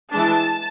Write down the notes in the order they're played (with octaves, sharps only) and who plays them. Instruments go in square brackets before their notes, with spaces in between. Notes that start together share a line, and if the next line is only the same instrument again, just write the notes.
[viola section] E3 G#3 D4 A5